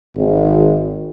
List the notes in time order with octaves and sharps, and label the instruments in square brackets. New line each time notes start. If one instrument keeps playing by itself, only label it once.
[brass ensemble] G#1